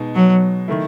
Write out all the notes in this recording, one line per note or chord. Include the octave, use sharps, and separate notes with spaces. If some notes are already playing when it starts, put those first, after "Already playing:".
Already playing: B2 G#3 D#4
F#3
D#3 A3 E4